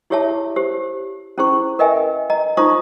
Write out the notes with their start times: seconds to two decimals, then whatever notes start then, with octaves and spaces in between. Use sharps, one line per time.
0.10 E4 G4 G#4 C#5 E5 A5
0.56 G4 C5
1.38 C#4 E4 G#4 C5 C#6
1.79 A#4 B4 D#5 E5 G5 G#5
2.30 D#5 A#5
2.57 D#4 F4 C5 A#5 C#6 D#6